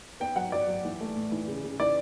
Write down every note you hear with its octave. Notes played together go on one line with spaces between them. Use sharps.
B3 G5
F#3 F#5
F#3 D5
F#3
E3
A3
A2
E3
C#3
C#3
E3 D5